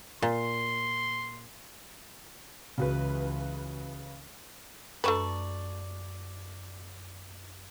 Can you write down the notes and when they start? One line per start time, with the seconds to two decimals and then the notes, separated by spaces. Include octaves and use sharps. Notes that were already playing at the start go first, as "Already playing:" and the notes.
0.22 A#2 C6
2.78 C#2 C#3 E3 F#4 B4
5.04 F#2 A3 D4 B4 D5 A5 C#6